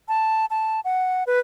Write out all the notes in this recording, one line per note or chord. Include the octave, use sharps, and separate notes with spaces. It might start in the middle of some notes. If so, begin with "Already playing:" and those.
A5
A5
F#5
B4